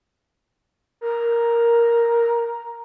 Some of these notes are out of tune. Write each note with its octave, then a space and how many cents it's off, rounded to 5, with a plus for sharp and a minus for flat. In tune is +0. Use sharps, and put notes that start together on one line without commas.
A#4 +5